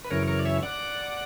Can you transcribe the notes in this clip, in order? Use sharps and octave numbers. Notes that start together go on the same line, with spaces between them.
B4
F#2 C#3 E3 A#4 C#5
A#4 C#5
D5
C#5 E5
D5 F#5